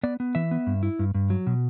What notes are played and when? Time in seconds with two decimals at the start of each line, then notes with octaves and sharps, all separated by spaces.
0.03 B3 D5
0.20 B3
0.35 E3 E5
0.51 B3
0.67 G2
0.83 E4
0.99 G2
1.14 G2
1.30 F#3
1.47 B2